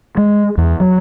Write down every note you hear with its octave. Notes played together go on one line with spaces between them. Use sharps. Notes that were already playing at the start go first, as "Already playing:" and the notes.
G#3
E2
F#3